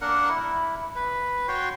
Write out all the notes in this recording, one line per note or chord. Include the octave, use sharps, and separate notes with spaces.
A#3 D4 A#4 F#5
E4
B4
F#4 C#5 G5 C6